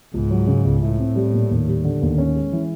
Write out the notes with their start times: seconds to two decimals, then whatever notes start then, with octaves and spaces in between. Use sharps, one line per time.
0.14 C#2 G#2
0.31 F#3
0.47 C#3
0.65 C#2
0.82 A2 E4
0.99 C4
1.16 G3
1.33 A#2
1.51 D#2
1.68 G3
1.84 D3
2.02 D#2
2.18 C#4
2.36 G#3
2.52 E3